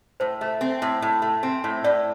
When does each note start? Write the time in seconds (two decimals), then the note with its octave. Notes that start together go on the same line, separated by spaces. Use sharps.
0.20 A2 C5
0.41 A3
0.61 C4
0.82 A2
1.02 A2
1.22 A3
1.43 C4
1.64 A2
1.84 A2 D5